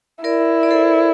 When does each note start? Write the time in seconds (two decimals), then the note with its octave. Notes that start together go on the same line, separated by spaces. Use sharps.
0.24 E4 A#4 D5
0.63 D5
0.71 A4 C5